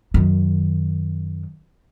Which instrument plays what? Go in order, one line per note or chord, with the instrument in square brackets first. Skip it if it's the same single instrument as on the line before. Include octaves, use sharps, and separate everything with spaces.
[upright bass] F#2 D#3